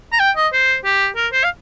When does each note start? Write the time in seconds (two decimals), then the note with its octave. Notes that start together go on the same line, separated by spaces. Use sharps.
0.12 A#5
0.20 G5
0.36 D#5
0.53 C5
0.85 G4
1.16 A#4
1.32 C5
1.44 F5